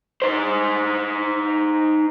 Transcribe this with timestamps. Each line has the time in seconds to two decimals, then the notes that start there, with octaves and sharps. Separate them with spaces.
0.22 D#4 C5